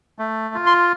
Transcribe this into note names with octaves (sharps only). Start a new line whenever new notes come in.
A3
F4
C6